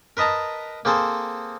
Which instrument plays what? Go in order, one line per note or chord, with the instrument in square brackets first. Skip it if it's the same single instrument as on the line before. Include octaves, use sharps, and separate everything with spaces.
[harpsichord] A#4 B4 D#5 A5 A#5
A#3 C4 G#4 A4 C5